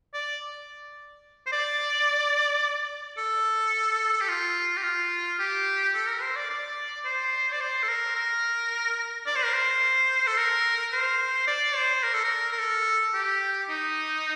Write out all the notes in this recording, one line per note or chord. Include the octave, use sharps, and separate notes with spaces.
D5
C5
D5
A4
A4
G4
F4
G4
F4
G4
A4
A#4
C5
D5
D5
C5
D5
C5
A4
A#4
A#4
D5
C5
A#4
C5
A4
A#4
C5
D5
C5
A#4
A4
A#4
A#4
A4
G4
D#4